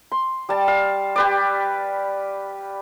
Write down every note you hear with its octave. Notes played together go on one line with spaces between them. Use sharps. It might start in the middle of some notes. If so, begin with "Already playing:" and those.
C6
G3 A5
F5
G4 B4 D5